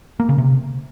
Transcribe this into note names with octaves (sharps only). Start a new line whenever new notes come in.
A#3
C#3
C3